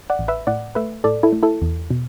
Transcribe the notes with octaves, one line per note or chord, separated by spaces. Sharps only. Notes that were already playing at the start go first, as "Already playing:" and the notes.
D5 F#5
A1
B4 E5
A2 D5 F#5
A3 B4 E5
A2 A4 D5
E4 A4
A3
E4 A4
E2
B2